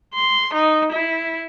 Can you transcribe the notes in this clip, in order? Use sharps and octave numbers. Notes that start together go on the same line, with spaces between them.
C6
D#4
E4